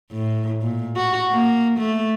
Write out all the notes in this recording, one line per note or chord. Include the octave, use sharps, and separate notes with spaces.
A2
A#2
F#4
A#3
A3